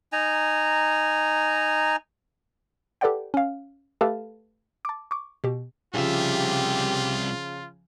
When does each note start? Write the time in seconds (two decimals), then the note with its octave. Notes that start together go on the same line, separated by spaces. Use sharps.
0.13 D#4 G#5 A#5
3.01 G4 A4 B4 D5 F#5 G5
3.34 C#4 F5
4.01 A3 G4 A4 B4 F5 A5
4.85 A5 D6
5.11 C#6 D6
5.44 B2 G4
5.94 C2 C#3 F3 F4 G4 E5